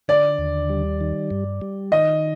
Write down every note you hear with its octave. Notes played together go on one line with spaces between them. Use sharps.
D3 D5
D#2
G3
D#3
G2
G3
D#3 D#5